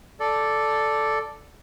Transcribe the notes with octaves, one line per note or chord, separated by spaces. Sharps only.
A4 D5